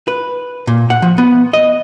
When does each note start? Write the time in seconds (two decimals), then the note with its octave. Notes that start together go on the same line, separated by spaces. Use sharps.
0.08 B4
0.67 A#2
0.90 F#5
1.02 F3
1.18 B3
1.53 D#5